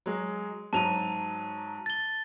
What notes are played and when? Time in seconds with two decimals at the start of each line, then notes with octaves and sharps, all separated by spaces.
0.06 F#3 G#3
0.73 G#2 F#3 A5 D#7 F7
1.86 A6 G7